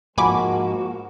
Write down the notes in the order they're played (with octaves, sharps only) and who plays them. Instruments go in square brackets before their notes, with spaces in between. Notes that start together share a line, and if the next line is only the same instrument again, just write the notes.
[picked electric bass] G#2 F3 [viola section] G#3 A#3 [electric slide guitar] F#4 [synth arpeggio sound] G#5 B5 D6